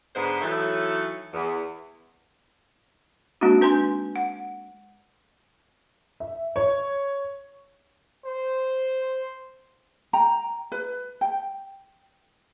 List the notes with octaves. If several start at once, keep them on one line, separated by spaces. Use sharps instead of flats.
G#2 D3 G#3 B3 B4 C5
E3 F#3 A3 D#4 A4 C#5
E2
G#3 A#3 C4 D4 D#4 F#4
D4 B4 G#5 C6
F#5
E5
C#5
C5
G5 A#5
B4
G5